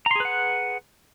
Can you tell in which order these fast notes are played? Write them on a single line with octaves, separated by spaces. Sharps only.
A#5 C6 G#4 B4 F#5